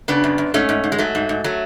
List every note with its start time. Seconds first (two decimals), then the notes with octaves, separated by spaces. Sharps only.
0.08 C#3 B3 D4
0.24 F#2
0.38 F#2
0.54 G#2 A3 C#4
0.69 G#2
0.84 G#2
0.92 G#3
0.98 G#2 F#3 A3
1.15 G#2
1.29 G#2
1.44 F#3 A3